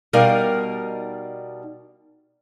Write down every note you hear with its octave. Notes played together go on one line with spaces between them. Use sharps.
B2 G3 D#4 A#4 D5 F5